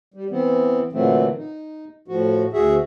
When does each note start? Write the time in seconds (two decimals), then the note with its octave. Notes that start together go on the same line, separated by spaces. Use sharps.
0.14 G3
0.30 E3 B3 C4
0.93 A#2 D3 E3 F#3 A3 C4
1.37 D#4
2.08 A2 F3 F#4
2.53 D2 F#4 G#4 E5